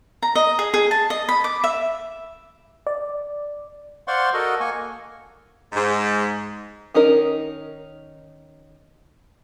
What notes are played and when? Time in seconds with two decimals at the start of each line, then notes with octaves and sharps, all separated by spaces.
0.23 A#5
0.35 D#5
0.59 G#4
0.74 G#4
0.91 A5
1.10 D#5
1.29 B5
1.44 D6
1.64 E5
2.87 D5
4.08 C5 D5 F5 F#5 C6 C#6
4.34 F#4 A4 A#4 D#5
4.60 A#3 G#5 C#6
5.73 G#2
6.94 D#3 C#4 D#4 A#4